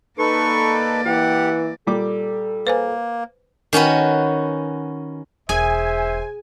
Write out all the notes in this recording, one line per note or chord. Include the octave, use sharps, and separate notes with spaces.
A#3 D#4 A4 B4 D5 C#6
E3 G4 F#5
A#2 G3 A4 D6
A#3 B4 C5 G#5
D#3 C#4 F#4 B4
E1 G#4 C5 E5 G#5